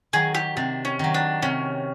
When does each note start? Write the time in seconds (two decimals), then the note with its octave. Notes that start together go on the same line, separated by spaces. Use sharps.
0.13 D#3 F#3 G#4
0.34 G4
0.57 C3 D4
0.85 C#4
0.99 D#3 F#3
1.14 D4
1.42 C3 C#4